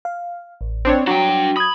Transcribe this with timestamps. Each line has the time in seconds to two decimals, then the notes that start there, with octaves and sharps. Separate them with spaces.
0.05 F5
0.61 A1
0.85 C4 D4 C#5
1.07 F#3 D4 G5 A#5
1.29 F#4
1.57 B5 D#6 G#6